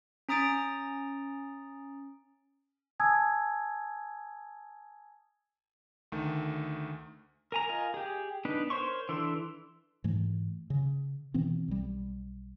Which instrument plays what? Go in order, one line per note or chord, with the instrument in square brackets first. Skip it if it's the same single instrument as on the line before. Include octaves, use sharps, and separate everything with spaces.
[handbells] C#4 A#5 D#6 A6 D7
[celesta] G#5 A5 D#6 E6 G#6
[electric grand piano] D2 D#3 A3
[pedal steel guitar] A#4 G#5 A#5
F4 A#4 D#5 G#5
G4 G#4
B3 D4 D#4 B4
A#4 C5 C#5 C6 C#6
E3 D4 A4 C6
[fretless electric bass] G#2 E3 A3
C#3
B2 E3 B3 C4
B1 G3